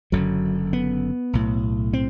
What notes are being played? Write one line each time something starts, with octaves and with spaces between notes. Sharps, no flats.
F#1 F#2 D3 F#3
B3
B1 A2
C4